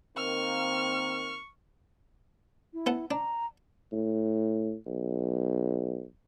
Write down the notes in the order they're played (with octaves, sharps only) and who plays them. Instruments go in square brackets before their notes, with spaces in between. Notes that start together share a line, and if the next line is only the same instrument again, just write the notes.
[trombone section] D#3 A#3 [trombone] C4 [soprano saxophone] C#6 [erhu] F6
[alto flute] E4
[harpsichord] B3 A4 F#5
[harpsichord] D4 [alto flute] A#5
[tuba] A2
B1